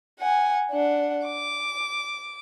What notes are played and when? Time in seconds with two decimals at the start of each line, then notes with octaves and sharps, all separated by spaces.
0.20 F#5 G#5
0.71 D4 F#5
1.26 D6